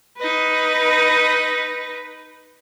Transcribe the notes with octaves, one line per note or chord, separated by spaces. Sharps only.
D#4 B4